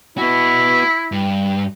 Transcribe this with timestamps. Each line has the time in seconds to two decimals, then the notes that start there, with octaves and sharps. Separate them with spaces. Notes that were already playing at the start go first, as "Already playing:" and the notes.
0.18 B3 E4 F#4
1.12 G2